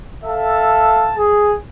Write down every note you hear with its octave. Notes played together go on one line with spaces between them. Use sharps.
A4 E5 F5 A5
G#4